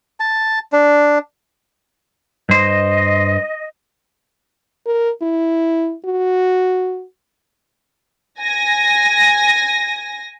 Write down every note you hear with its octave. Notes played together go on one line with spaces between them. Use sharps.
A5
D4
G2 C5 D#5
A#4
E4
F#4
G#5 A#6